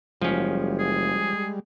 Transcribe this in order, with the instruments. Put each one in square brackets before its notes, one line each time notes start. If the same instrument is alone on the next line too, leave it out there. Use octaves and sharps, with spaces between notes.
[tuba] F#1 [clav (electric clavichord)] F3 C#4 [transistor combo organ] G3 G#3
[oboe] G#4